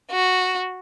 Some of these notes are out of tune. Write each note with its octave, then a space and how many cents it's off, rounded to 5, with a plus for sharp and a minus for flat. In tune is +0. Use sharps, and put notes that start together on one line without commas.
F#4 -5